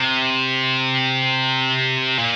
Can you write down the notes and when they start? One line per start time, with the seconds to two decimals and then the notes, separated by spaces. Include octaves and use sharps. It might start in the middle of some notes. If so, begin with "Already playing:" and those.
Already playing: C3
2.18 A#2